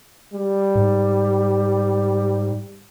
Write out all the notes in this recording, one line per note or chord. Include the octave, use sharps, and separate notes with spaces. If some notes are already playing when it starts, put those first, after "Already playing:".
G3
G#2